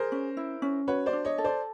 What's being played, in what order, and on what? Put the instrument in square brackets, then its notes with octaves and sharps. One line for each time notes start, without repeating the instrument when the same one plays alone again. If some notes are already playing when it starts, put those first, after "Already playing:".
Already playing: [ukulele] G#4 [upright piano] A#4 C5
[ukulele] C#4
E4
C#4
[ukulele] F#4 [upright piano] B4 C#5
[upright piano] C5 D5
[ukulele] D4
[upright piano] C#5 D#5
[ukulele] A4
[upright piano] C5 D5